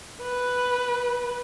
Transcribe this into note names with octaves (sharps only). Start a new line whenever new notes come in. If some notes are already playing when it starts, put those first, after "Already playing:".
B4